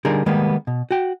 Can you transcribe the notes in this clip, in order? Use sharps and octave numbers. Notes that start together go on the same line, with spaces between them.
D3 G3 D#4 G#4 A#4
D#3 G3 G#3 A#3 B3
B2
F#4 G5